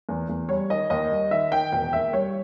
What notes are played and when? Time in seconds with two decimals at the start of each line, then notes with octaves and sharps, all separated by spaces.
0.09 E2
0.29 E2
0.49 G3 C#5
0.70 D#3 D#5
0.90 D#2 D#5
1.11 G3
1.31 D#3 E5
1.52 D#3 G5
1.72 E1 G5
1.92 D#2 E5
2.13 G3 C#5